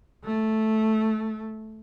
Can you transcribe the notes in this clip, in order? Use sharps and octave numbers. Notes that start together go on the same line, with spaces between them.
A3